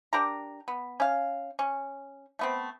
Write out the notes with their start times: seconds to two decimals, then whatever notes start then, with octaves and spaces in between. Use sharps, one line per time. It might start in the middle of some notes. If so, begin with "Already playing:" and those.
0.13 D4 G4 A#4 A#5
0.68 B3
1.00 C#4 F5
1.59 C#4
2.39 A3 B3 C4